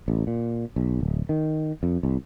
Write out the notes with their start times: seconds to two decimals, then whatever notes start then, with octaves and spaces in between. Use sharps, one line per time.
0.08 A1
0.27 A#2
0.76 B1
1.00 D1
1.29 D#3
1.83 F2
2.03 C2